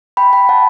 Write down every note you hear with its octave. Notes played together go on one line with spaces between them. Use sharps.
G5 B5
G5 B5
F#5 A5